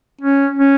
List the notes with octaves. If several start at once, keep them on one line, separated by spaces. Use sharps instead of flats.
C#4
C#4